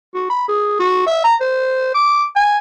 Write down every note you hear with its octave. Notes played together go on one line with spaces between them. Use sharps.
F#4
B5
G#4
F#4
E5
A#5
C5
D6
G#5